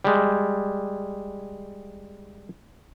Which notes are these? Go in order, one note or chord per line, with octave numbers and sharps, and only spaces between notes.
G3 G#3